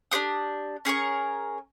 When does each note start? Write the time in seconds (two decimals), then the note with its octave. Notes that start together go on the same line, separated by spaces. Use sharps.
0.11 D4 G4 C5 D#6
0.85 C#4 G#4 A#4 C#6